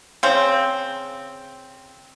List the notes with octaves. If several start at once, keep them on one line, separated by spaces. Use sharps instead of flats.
C#3 C4